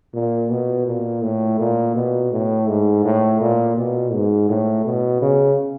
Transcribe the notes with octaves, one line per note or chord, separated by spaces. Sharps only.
A#2
B2
A#2
A2
A#2
B2
A2
G#2
A2
A#2
B2
G#2
A2
B2
C#3